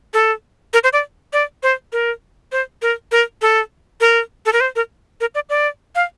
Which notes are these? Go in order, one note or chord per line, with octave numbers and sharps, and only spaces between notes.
A4
A#4
C5
D5
D5
C5
A#4
C5
A#4
A#4
A4
A#4
A4
A#4
C5
A#4
A#4
D5
D5
F5